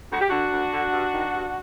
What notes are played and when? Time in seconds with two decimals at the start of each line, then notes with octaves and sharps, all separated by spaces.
0.12 D2 F#4
0.20 G4
0.29 D3 D4 F#4
0.53 D2
0.73 D3
0.93 G2
1.13 D#3
1.34 G2